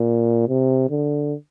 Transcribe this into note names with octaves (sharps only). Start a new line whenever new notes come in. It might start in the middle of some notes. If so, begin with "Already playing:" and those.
Already playing: A#2
C3
D3